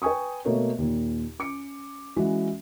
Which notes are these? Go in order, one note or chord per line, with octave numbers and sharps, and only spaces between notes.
B4 G5 G#5 C#6 D#6
B2 A3 A#3 C#5
D#2 A#2
C#4 D6 C#7
E3 G#3 C#4 F#4